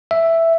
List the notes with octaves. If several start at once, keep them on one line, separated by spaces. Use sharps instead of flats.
E5